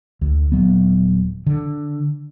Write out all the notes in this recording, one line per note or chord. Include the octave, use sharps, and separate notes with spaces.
D2
D#1 F#3 B3
D3